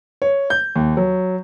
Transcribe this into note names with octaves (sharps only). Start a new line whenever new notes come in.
C#5
G6
D#2
F#3